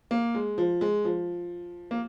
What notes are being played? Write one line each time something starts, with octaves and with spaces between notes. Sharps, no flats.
A#3
G#3
F3
G#3
F3
A#3